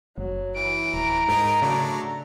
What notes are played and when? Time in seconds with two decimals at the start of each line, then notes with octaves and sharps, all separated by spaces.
0.18 F#1 F#3
0.56 E3 D7
0.94 D1 A#5
1.28 G#2 G#3 D#4 A#4
1.62 C#3 F#3 A3 D4